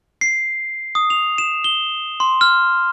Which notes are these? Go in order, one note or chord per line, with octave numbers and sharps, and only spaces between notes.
C7
D#6
F7
E7
G7
C6
F6